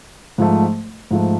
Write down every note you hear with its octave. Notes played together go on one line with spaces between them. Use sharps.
G#2 F3 A3
G#2 F3 A3